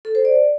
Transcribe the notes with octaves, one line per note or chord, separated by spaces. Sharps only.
A4
C5
D5